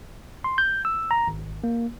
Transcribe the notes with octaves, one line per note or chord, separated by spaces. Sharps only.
C6
G6
E6
A#5
G#1
A#3